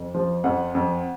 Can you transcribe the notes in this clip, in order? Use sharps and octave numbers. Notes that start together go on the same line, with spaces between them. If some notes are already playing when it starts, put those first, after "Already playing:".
Already playing: F2
F3
F2 F#5
F2